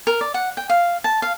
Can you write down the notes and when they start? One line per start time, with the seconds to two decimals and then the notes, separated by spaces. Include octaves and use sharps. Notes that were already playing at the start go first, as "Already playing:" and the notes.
0.07 A#4
0.21 D5
0.34 F#5
0.57 G5
0.69 F5
1.04 A5
1.22 F5